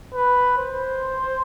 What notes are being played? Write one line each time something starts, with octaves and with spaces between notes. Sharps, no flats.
B4
C5